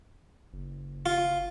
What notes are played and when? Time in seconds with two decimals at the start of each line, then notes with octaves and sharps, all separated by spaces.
0.53 F#1
1.06 F4